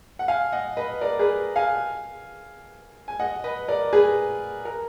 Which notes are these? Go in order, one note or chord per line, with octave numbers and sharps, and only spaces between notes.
F#5
F5 G#5
D#5 F#5
B4 D#5
A#4 D5
G#4 B4
F5 G#5
G#5
D#5 F#5
B4 D#5
A#4 D5
G#4 B4
A#4